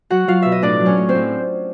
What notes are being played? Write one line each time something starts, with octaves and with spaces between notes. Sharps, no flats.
F#3 F#4 F#5
F#3 F4 F5
B2 E5
D#5
A2 D4 D5
F#3
C#4 C#5
A2
C4 C5
A2